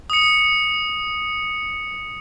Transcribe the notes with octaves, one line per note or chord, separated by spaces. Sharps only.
D#6 C#7